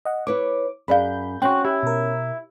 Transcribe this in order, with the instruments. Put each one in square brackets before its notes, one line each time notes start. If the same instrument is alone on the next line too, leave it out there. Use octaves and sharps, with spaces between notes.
[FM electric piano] D#5 F#5
[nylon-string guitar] E4 B4 C#5 [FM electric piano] D6
[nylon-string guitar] F#2 [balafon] G#4 D5 F5 [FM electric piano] B5 G6
[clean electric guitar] C4 F#4 [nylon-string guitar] C#4 [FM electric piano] G5 F#6
[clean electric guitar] E4 [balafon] G4
[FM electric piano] B2 A#4